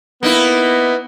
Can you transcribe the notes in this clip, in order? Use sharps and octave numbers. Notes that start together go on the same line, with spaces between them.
A#3 B3 D#4 E4